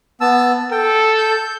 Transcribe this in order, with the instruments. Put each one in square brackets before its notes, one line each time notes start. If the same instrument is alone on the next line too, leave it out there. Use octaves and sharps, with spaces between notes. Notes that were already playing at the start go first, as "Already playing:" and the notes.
[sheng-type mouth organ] B3 A5 E6
[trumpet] A4 [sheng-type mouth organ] G5
[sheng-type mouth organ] G6